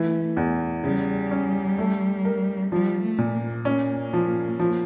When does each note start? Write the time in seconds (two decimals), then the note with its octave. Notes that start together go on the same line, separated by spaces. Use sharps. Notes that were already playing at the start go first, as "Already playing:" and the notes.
Already playing: E3 A3
0.37 E2
0.84 C#3 G3
1.31 C#4
1.78 A3
2.25 A#4
2.72 F3 G3
3.03 A3
3.18 A#2
3.34 A#3
3.65 A#3 C#4
4.13 F3
4.59 F3